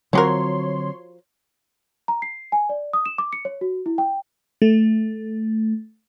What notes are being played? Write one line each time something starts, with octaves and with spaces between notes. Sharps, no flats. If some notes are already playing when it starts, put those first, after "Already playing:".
D3 F3 F#3 C4 F#4 A#4 C#5 C6
A#5
C7
G#5
D5
D#6
E7
D6
C#7
C#5
F#4
E4
G5
A3